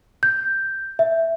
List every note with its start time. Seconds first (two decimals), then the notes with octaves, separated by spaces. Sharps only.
0.23 G6
0.99 E5